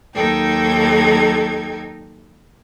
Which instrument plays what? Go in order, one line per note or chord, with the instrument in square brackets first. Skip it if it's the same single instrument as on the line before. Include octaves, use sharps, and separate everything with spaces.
[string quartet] D#2 F#3 D#4 A4 G5 G#6